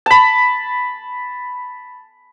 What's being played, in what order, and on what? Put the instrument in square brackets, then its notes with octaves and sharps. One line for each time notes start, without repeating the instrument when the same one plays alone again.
[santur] A5 B5